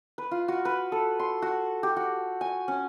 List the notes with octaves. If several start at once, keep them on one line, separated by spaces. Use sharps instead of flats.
B4
F4
F#4
B4
A4
C6
F#4
G4
F#4
G#5
C#4